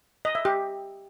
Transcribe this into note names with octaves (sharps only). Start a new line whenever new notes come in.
D#5
E5
G4